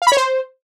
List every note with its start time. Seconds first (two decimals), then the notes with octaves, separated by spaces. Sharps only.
0.02 F5
0.07 B5
0.12 C#5
0.17 C5